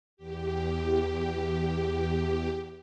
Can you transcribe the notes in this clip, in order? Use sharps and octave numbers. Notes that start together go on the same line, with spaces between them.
E2 G4